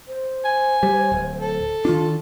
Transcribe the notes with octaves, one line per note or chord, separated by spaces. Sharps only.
C5
G#5
G3
D1
A4
D#3 D4 F4